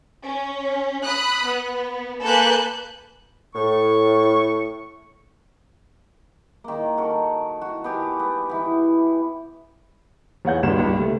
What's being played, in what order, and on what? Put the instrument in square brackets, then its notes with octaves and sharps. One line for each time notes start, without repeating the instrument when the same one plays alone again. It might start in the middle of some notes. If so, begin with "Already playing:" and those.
[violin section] C#4
B5 D#6 F#6
B3
A#3 A4 B4 G#5 F#6 G6
[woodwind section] A2 C#6
[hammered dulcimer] D#3 A#3
F#4 A4 A#4
F#4
B3 G4 G#5
B3
E3 B3
[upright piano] E2 C#5 F#5 G6
G#1 C#2 G2 E7
C#2 G2
C3 A3